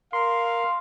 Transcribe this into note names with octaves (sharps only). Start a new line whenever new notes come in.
A#4 F5 C6